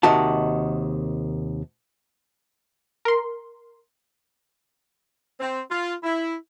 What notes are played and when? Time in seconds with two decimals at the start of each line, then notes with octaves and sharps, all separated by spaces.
0.03 D#2 C3 D#3 F#4 A5
3.05 A#4 C6
5.40 C4
5.71 F4
6.04 E4